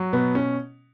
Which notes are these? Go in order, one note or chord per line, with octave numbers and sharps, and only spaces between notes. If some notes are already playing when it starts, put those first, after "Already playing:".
Already playing: F#3
B2 B3
C#4